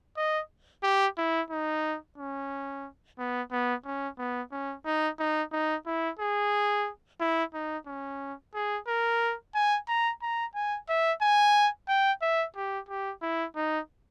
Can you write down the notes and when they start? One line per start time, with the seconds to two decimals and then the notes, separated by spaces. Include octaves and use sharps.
0.17 D#5
0.83 G4
1.18 E4
1.51 D#4
2.18 C#4
3.19 B3
3.51 B3
3.85 C#4
4.18 B3
4.52 C#4
4.86 D#4
5.19 D#4
5.52 D#4
5.86 E4
6.20 G#4
7.20 E4
7.54 D#4
7.87 C#4
8.55 G#4
8.88 A#4
9.55 G#5
9.88 A#5
10.22 A#5
10.55 G#5
10.89 E5
11.22 G#5
11.89 G5
12.22 E5
12.56 G4
12.89 G4
13.22 E4
13.56 D#4